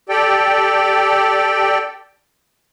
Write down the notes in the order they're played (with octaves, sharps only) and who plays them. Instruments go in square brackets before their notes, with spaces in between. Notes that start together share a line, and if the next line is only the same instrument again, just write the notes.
[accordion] G4 A4 D5 G5